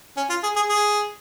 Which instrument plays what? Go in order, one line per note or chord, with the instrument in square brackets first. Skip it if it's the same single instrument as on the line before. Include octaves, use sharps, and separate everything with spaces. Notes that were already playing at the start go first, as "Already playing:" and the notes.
[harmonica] C#4
F4
G#4
G#4
G#4